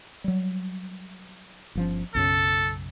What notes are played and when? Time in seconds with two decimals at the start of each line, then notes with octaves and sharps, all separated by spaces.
0.24 F#3 G3
1.75 G1 F3 C#4
2.15 B1 F#2 C#3 A4